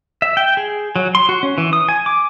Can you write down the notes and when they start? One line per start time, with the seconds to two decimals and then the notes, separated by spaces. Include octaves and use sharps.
0.22 E5
0.37 G5
0.57 G#4
0.96 F#3
1.15 C6
1.29 F#4
1.43 C#4
1.58 E3
1.73 D#6
1.89 G#5
2.06 D6